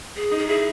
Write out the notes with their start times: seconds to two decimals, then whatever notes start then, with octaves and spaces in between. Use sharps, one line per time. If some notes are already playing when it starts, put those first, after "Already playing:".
0.16 G#4
0.31 D#4
0.38 G#4
0.48 E4 G#4